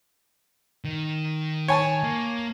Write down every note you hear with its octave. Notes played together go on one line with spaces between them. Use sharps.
D#3
C#5 G#5 A5
A#3